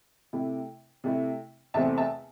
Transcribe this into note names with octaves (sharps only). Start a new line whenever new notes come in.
C3 A3 E4
C3 A3 E4
E2 C3 A3 C4 E5 A5
E5 A5